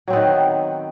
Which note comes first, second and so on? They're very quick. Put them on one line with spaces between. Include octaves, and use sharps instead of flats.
F#3 C4 B3 D#3